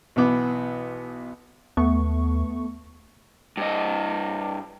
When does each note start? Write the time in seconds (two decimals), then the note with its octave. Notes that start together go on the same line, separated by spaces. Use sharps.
0.16 B1 E3 B3 D6
1.77 D#2 A3 B3 C#6
3.57 G2 D#5